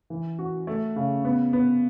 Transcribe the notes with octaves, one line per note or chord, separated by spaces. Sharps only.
E3
F#4
A3
C#3
B3
B3